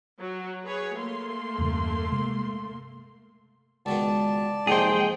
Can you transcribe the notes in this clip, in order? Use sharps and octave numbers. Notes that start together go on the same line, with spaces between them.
F#3
G#4 B4 C#5
A3 A#3 C6
E2 G2 C#3
C3 G#3
C#2 B2 D#3 D5 A5
F2 C3 G#3 A#3 G#4 C5 G5